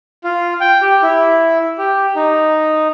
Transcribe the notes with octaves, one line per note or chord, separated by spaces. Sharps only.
F4
G5
G4
E4
G4
D#4